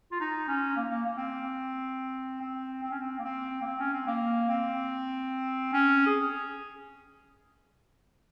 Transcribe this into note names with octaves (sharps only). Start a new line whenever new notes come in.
F4
D#4
C#4
A#3
A#3
A#3
C4
C4
C4
C#4
C4
A#3
C4
A#3
C4
C#4
C4
A#3
C4
C#4
G#4